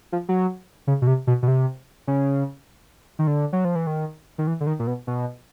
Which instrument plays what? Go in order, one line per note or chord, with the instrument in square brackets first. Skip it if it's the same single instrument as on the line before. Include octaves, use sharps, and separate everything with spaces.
[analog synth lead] F3
F#3
C#3
B2
C3
B2
B2
C3
C#3
D#3
D3
F#3
F3
E3
D#3
D#3
E3
D3
D#3
A#2
B2
B2